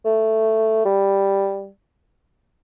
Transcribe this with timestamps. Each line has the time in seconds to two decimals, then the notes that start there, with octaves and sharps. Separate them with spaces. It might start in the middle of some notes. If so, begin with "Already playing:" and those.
0.05 A3
0.85 G3